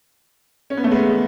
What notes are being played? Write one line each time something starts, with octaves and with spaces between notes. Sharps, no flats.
C#4
B3
A3
G#3 B3